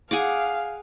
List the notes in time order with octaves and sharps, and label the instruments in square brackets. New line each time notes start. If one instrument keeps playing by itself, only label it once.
[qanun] G#4 F#5 D6 [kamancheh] F5